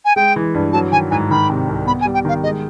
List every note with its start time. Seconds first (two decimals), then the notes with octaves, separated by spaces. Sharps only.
0.05 G#5
0.16 G#3 G5
0.36 E3
0.54 G2
0.73 F#3 A5
0.92 D#3 G#5
1.10 G#2 G#5
1.30 D#3 B5
1.49 C3
1.68 C2
1.86 B3 B5
2.01 G#5
2.05 G3
2.14 G5
2.25 D#3 F5
2.43 G#3 D#5